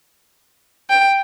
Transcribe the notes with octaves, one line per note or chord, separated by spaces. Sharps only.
G5